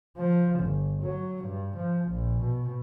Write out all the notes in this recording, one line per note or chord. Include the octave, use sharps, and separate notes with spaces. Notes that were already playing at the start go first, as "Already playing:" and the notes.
F3
G1
F#3
G2
F3
A#1
B2